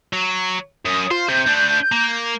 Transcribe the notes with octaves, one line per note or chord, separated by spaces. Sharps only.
F#3
F#2 D#6
F4 C5
C3 G6
A3 D4
A#3